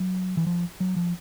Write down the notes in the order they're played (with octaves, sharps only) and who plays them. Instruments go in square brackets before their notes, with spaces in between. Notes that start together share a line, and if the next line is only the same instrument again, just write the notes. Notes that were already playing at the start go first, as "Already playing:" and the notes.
Already playing: [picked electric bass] F#3
E3
F3
F#3
F3